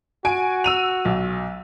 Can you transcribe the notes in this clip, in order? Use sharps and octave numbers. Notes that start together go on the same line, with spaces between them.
F#4 G#5 D7
E6 D#7 F7
B1